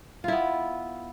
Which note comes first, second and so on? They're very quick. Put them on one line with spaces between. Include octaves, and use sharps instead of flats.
F4 E4 B3